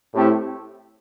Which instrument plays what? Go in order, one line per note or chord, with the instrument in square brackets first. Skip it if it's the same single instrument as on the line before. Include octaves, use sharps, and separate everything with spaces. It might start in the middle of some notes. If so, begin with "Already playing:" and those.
[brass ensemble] A2 A3 C4 E4 G4